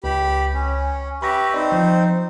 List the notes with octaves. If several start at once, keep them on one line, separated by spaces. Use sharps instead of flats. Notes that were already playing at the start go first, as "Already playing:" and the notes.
C#2 G4 B5
C#4
G4 B4 E5 B5 C#6 A#6
C4 D#4 C5 D5
F3